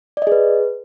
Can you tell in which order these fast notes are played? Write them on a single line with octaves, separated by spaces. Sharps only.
D5 D#5 G#4 B4